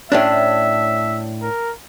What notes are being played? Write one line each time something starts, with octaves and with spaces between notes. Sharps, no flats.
A2 C#4 D4 E5
A#4